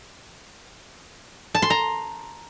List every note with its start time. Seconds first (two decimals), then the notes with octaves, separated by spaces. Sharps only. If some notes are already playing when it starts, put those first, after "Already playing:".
1.55 A5
1.62 C6
1.70 A#5